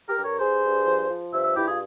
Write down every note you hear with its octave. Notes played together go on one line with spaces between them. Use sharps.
G4 A#4
G2
A#4 C#5
G2 G#4 C5
G2
F3
F3
G2 C5 E5
C5 E5
G2 E4 G4
F4 G#4